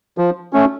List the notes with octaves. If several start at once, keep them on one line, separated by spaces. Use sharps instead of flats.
F3
A3 C#4